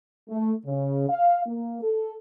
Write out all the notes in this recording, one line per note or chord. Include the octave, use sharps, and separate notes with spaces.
A3
C#3
F5
A#3
A4